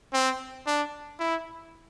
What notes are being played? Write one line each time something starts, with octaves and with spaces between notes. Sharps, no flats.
C4
D4
E4